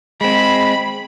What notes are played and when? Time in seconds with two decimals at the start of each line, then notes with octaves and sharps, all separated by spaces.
0.21 G#3 C4 B5